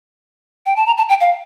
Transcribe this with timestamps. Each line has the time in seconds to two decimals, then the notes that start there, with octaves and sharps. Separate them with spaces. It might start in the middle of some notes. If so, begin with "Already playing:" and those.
0.66 G5
0.76 A5
0.86 A#5
0.97 A5
1.09 G5
1.21 F5